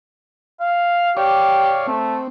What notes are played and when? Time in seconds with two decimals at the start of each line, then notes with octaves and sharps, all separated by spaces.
0.60 F5
1.17 G4 C#5 D5 F5
1.87 A3 C4